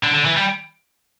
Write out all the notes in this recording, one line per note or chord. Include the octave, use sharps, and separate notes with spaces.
D3
D3
E3
G3